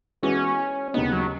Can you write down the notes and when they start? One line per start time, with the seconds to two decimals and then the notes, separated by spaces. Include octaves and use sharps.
0.23 E3 G#3 B3 C#4 F#4
0.94 D#2 C#3 G#3 B3 D#4
1.12 F#3